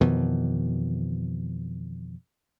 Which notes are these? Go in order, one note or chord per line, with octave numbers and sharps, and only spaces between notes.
F2 B2 D#3 E3